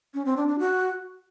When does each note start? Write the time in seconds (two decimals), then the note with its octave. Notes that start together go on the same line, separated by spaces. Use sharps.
0.14 C#4
0.25 C4
0.36 D4
0.48 D4
0.59 F#4